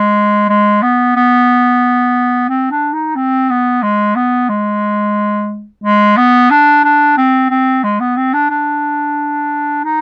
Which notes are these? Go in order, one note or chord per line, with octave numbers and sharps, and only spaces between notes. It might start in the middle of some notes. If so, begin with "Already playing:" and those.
Already playing: G#3
G#3
B3
B3
C4
D4
D#4
C4
B3
G#3
B3
G#3
G#3
B3
D4
D4
C4
C4
G#3
B3
C4
D4
D4
D#4